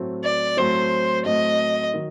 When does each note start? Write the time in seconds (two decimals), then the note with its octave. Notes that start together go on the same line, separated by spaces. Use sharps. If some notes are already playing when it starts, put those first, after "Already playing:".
Already playing: A2 F#3 A3 C4
0.24 D5
0.57 A2 F#3 A3 C4 C5
1.25 A2 F#3 A3 C4 D#5
1.94 D#3 F#3